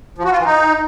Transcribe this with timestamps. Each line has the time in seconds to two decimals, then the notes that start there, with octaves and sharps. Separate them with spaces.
0.18 F3
0.25 F#4
0.32 F4
0.39 E3
0.45 D#4